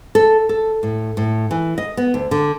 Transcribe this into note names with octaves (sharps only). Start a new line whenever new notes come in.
A4
A4
A2
A2
E3
D#5
B3
D2
D3